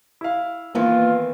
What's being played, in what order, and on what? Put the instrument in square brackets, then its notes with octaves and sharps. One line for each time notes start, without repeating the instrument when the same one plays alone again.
[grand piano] E4 F5
[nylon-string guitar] D#3 E3 B3 [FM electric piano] A#3 [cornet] F4